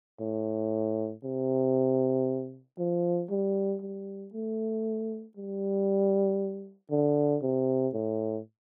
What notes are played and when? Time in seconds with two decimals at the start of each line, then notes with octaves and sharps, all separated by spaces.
0.21 A2
1.24 C3
2.79 F3
3.30 G3
3.82 G3
4.33 A3
5.37 G3
6.91 D3
7.42 C3
7.94 A2